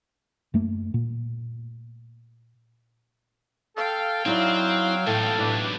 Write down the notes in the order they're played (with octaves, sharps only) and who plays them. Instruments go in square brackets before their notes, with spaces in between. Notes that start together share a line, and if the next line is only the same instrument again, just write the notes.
[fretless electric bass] F#2 A3 A#3
A#2
[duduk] A4 [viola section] F5 G5
[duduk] F#3 [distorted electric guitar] C4 [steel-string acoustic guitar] D#4 E4 D5
[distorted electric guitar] B1 E3 [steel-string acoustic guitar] A2 [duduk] A4
[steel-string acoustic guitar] A2 [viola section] D4 G4 B4